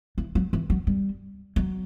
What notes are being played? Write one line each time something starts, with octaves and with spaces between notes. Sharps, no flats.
E3
F#3
E3
F#3
G3
F#3